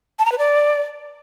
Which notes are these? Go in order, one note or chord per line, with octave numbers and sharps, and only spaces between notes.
A5
A#5
B4
D5